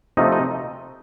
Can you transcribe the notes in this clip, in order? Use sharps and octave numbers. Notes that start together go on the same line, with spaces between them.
C3 F3 A3 D#4 D#5
D#4 D#5